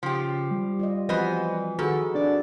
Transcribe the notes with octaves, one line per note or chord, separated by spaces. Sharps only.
C#3 F3 G4
G3
F4 D5 D#5
E3 F3 B3 C4 F#4 C5 D#5
D#3 F#4 G#4 A4 B5
C4 D4 F#4 B4 D5